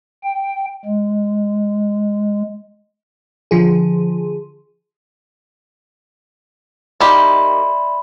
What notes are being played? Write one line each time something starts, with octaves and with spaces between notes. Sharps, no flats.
G5
G#3
D3 F3 G#4
D#3 G4 D5 E5 B5 C6